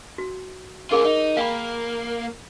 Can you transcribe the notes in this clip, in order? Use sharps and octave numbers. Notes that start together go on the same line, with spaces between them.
F#4
C#4 F4 G#4 A#4
D#4
A#3 F5 G5 B5